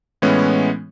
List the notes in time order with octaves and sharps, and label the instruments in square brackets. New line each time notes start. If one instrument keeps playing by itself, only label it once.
[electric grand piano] A2 E3 G#3 B3 C#4